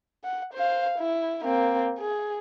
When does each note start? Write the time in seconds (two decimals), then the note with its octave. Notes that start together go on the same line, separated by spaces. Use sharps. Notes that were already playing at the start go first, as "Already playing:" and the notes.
0.24 F#5
0.54 C5 F5
0.99 E4
1.45 A#3 C4
1.99 G#4